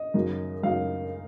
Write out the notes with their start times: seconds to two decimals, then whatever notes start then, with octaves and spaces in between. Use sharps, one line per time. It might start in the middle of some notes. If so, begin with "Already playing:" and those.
Already playing: D#5
0.14 F#2 C#3 F#3 A#3 D#4
0.63 F#2 C#3 F#3 A#3 D#4 F5